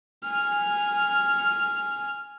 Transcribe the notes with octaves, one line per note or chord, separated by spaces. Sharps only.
G#5 F6